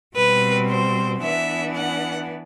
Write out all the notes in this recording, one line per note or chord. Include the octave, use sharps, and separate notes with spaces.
B2 G3 C4 B4
C5
E3 B3 D4 E5
F#5